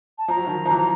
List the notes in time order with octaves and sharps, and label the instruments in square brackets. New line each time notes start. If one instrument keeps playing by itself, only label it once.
[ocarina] A5
[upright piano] F3 [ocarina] A#5
[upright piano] F#3
D#3 F3
F3
E3 F#3